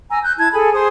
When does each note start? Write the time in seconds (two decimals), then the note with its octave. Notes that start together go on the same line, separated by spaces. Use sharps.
0.10 G#5 A#5 E6
0.22 F#6 G6
0.37 E4 A5 G#6
0.52 G#4 A4 G#5 B5
0.73 G#4 C5 C6 D#6